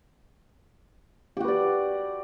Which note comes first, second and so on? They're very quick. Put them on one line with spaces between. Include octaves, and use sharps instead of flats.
G4 F#4 B4 D5